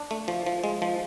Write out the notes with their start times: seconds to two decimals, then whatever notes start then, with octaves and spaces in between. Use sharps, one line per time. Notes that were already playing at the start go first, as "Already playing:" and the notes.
Already playing: D4
0.11 A3
0.28 F3
0.46 F3
0.64 G#3
0.82 F3